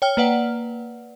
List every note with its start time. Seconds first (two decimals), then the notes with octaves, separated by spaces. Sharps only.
0.02 C#5 G5 F6
0.17 A#3 B4 D5 F#5